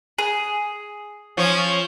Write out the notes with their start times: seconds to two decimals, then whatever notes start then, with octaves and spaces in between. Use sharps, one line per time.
0.18 G#4
1.37 F3 C#4